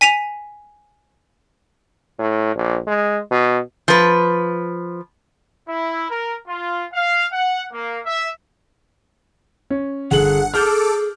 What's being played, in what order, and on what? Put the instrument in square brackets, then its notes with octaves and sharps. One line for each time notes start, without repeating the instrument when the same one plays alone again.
[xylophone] G#5 B6 D#7 F7
[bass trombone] A2
A#1
G#3
B2
[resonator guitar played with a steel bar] F3 B4
[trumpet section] E4
A#4
F4
F5
F#5
A#3
E5
[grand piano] C#4
[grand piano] G1 F#7 [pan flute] G#4 [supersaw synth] F#5
[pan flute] G#4 [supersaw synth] A4 D6 [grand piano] F6 G6